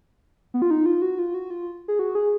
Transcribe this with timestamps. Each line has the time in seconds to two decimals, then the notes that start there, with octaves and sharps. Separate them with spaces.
0.54 B3
0.62 F4
0.71 D#4
0.86 F4
1.02 F#4
1.19 F4
1.34 F#4
1.50 F4
1.88 G#4
1.99 F#4
2.15 G#4